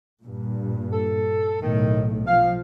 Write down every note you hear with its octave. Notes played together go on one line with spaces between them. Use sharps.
G2 A#2
A4
B1 A2 D#3
F3 F5